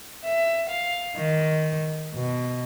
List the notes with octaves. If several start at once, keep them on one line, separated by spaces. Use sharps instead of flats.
E5
F5
D#3
B2